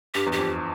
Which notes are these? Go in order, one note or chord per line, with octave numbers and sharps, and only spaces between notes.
G2 G4
E2
G4
F2